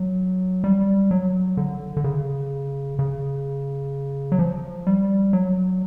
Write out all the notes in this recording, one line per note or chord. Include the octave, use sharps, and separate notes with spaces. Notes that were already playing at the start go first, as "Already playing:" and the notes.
Already playing: F#3
G3
F#3
D3
D3
C#3
C#3
F#3
F3
G3
F#3